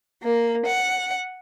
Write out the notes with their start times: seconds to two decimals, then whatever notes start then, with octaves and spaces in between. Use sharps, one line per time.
0.22 A#3
0.66 F#5